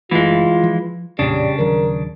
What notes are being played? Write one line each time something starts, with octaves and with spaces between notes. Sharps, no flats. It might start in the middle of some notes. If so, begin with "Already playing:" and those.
F#1 E3 G#3 A3 F4
F3
A1 F2 A#2 C#3 G3 D4
D#1 D#3 F#3 A#4